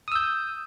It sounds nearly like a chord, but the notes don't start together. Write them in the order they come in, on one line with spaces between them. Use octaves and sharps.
D#6 E6 G6